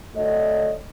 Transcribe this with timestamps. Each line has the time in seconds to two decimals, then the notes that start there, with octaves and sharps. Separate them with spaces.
0.15 D3 A3 F#4 C#5 D#5